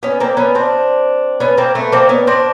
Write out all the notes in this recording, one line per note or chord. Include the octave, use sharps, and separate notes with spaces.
B3 C#4
A#3 C4
B3 C#4
C4 D4
B3 C#4
A#3 C4
A3 B3
A#3 C4
B3 C#4
C4 D4